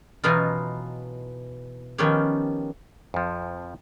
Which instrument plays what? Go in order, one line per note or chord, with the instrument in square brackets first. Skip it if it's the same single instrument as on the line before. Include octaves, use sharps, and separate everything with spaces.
[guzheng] B2 E3 F#3 B3 D#4 F4
D#3 F3 B3 C#4 G4 C#5
[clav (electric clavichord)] F2 F3